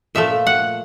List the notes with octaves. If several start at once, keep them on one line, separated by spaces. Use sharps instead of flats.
A#2 F3 A3 E5
F#5